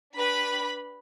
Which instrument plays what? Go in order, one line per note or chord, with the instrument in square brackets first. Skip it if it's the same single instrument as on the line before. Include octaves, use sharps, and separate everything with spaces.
[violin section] D4 G4 B4 B5